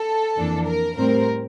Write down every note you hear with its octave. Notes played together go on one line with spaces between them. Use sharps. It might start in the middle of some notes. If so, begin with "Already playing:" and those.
Already playing: A4
F2 E3 A#3 D4
A#4
A2 G3 C4 A#4